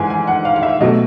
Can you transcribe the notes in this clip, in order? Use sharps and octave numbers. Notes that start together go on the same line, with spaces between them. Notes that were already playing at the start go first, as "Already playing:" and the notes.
Already playing: G#2 E3 G#3 G#5
G#5
F#5
F5
F5
E5
B2 F#3 A3 D#5